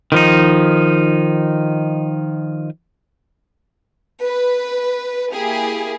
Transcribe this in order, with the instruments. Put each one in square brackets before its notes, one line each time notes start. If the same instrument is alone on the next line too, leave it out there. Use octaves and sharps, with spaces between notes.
[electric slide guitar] D#3 F3 D#4
[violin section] B4
A#3 E4 G4 G#4